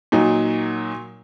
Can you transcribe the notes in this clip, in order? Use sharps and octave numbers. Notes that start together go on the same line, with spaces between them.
A#2 F#3 D#4